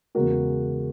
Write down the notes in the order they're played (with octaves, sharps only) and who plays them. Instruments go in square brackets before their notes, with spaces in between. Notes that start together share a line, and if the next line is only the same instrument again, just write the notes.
[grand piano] E2 C#3 G#3 F#4 A#4